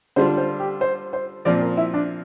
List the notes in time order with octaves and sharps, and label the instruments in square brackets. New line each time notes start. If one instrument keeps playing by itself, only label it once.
[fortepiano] D3 G3 D4 F4 [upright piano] C5
[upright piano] C5
G4
C5
C5
[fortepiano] A#2 F3 C4 [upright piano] D5
[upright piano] A#4
E4
D4